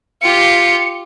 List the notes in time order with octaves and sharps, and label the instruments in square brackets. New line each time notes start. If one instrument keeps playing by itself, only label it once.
[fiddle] F4 G4 [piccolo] C#7